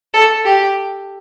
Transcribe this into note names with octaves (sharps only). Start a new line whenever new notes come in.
A4
G4